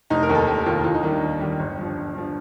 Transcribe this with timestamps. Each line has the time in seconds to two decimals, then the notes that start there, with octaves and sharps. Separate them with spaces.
0.10 F1 D#4
0.23 A#4
0.29 D#2 D#3
0.35 A4
0.47 F1 G4
0.66 D#2 D#3 F4
0.84 D#2 F4
0.94 D#4
1.03 D#3 G3 D4
1.12 D#4
1.22 D#2
1.41 D#3 G3
1.59 G1
1.78 G2 F3
1.97 G1
2.14 G2 F3